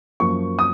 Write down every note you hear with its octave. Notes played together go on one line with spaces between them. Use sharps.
F#2 F3 A#3 C#6
D#6